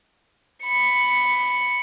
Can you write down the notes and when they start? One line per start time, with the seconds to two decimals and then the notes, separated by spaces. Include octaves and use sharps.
0.64 B5 C#7